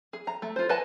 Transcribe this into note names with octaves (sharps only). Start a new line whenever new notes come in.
G#4
A#5
A3
F4 C5
B4 D#5 F#5 G#5 A5